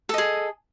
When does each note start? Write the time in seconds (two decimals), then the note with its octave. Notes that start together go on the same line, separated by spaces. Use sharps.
0.09 A4
0.14 D#5
0.18 G#4